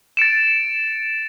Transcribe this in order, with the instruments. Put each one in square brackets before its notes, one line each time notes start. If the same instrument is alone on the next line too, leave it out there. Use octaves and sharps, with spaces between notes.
[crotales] A6 C#7 D7 E7